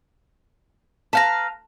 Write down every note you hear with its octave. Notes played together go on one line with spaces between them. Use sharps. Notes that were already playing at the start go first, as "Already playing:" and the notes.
B4 F5 A5 A#5